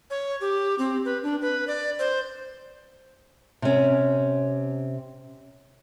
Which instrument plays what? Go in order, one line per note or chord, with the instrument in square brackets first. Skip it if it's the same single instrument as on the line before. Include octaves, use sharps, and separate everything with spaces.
[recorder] C#5
G4
C4
B4
D4
B4
D5
C5
[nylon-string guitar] C3 C#4